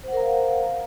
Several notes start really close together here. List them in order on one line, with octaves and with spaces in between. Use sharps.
C5 F#5 A#4 A#5 F5